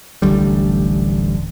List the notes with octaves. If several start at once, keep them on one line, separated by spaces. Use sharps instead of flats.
D1 A1 D3 G3